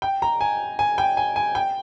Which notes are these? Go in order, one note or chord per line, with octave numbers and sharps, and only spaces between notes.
G5
A#5
G#5
G#5
G5
G#5
G#5
G5